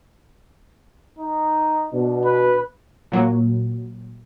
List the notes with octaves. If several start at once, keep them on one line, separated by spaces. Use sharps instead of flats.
D#4
B2 D4
B4
A#2 F#3 A#3